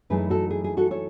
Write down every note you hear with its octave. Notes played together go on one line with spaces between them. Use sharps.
F#2 E3 A3 D#4 G#4 B4
F#4 A4
G#4
G#4
F#4 A4
A4 C#5